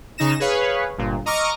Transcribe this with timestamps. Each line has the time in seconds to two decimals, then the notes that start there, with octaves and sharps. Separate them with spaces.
0.18 C#3 D#4 A#6 E7
0.40 G#4 B4 C#5 F5
0.98 G1 A#2
1.26 D#5 A#5 C#6 D6 F6